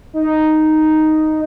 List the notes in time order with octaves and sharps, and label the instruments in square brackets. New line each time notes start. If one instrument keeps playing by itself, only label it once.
[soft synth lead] D#4